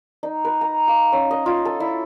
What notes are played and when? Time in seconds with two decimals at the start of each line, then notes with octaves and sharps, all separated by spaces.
0.23 D#4
0.45 B4
0.61 A#5
0.88 F5
1.12 C#4
1.31 D#5
1.46 F4
1.65 A4
1.80 E4